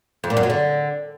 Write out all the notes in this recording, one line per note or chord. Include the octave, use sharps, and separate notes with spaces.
F2
A#2
F#2
F#3
D3